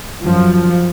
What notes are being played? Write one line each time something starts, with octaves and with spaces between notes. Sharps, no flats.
F#2 F3